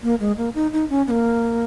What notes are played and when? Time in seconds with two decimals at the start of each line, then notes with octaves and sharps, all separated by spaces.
0.03 A#3
0.20 G#3
0.37 A#3
0.55 D#4
0.73 D#4
0.90 C#4
1.07 B3
1.10 A#3